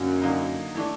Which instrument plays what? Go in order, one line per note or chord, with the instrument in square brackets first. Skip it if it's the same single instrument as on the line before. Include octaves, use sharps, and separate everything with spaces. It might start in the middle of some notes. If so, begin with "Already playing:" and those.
Already playing: [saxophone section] F#2 [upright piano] D3 F#3 A#3 D#4
[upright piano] D3 F#3 A#3 D#4
E3 A3 D4